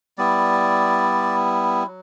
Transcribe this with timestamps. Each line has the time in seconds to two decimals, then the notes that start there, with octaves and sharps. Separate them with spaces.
0.18 G3 B3 E4 D5
1.87 F#3